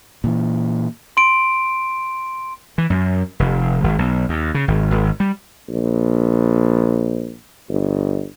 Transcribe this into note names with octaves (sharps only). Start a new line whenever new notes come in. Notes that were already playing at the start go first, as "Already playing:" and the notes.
A#2 E3
C6 D7
E3
F#2
F1
G#1
B1
D#2
C#3
G#1
G#1
G3
A#1
G1